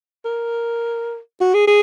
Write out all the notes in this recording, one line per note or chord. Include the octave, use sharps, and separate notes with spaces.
A#4
F#4
G#4
G#4